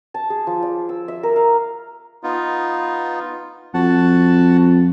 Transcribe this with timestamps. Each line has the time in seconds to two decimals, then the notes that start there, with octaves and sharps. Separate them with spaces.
0.14 A5
0.30 G#4
0.47 F3
0.63 D5
0.89 E6
1.08 E5
1.23 A#4
1.36 F5
2.23 B3 D#4 F4
3.74 F2 F#4 F#5 A5